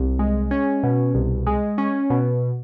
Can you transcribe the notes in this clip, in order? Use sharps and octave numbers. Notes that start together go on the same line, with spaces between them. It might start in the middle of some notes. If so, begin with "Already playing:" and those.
Already playing: C2
G#3
C#4
B2
C2
G#3
C#4
B2